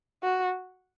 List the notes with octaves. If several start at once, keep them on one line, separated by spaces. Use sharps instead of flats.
F#4